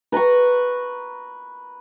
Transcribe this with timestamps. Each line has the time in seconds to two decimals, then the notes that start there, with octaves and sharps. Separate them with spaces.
0.12 B4 A#5 B5 C#6